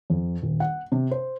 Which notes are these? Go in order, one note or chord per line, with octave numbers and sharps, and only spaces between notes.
F2
D#1
F#5
C3
C5